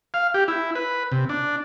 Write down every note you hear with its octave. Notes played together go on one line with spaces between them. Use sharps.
F5
G4
E4
B4
C3
D4